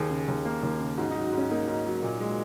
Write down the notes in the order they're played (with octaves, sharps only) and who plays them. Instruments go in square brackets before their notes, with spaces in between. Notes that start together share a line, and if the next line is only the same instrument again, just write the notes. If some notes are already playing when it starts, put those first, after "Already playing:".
Already playing: [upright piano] D#2 [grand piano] G#4
[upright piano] C#3
D#2
A#3
D#2
C#3
[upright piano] G#2 [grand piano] F#4
[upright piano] F#3 [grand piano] D#4
[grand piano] F#4
[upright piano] G#2
[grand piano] C#4
[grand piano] A#3 [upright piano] D#4
[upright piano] G#2
F#3
A#2
G#3